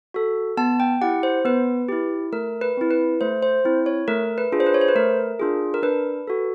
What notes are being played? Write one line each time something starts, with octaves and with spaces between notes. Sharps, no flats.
F#4 A4
B3 A5
G5
E4 G4 F#5
C5
B3 B4
E4 G4
A3 A#4
B4
C4 E4
B4
A3 C5
C5
C4 E4
C#5
A3 A#4
B4
D4 F4 G#4
C5
B4
C#5
C5
B4
A3 A#4
D4 F4 G#4
A#4
D4 B4
F#4 A4